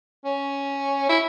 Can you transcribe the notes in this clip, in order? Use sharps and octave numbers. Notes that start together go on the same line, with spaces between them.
C#4
E4